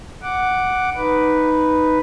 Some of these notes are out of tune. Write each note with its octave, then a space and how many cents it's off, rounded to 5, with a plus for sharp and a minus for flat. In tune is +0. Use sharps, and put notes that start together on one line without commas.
F#5 +0 D6 +0
D#4 +0 B4 +0